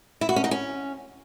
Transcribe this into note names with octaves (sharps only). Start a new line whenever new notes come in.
E4
F#4
C#4
D#4
C#4